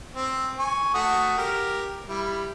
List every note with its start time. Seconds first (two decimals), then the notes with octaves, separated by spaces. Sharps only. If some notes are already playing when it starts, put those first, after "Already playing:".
0.15 C4
0.59 G#5 C#6
0.94 A3 F#4 D#6
1.38 G4 A#4
2.08 G3 E4